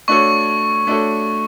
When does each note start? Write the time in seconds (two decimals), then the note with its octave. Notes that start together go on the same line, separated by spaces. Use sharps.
0.08 A3 D4 F#4 A4 C#5 C#6
0.87 A3 D4 F#4 A4 C#5